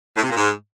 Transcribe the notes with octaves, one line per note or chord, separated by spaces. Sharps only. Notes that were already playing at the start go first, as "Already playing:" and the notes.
A2
C3
A#2
G#2